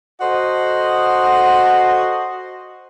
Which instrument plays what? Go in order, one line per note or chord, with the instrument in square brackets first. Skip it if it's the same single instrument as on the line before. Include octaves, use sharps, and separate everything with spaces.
[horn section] F#4 A4 C5 D#5